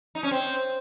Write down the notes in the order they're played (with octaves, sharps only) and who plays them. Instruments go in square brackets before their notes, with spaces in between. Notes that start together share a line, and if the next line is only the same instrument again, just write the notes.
[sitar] D#4
C#4
C4